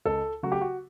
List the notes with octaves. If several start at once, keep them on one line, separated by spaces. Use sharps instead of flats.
C#2 A4
C#3 F#3 A3 F#4
G4
F#4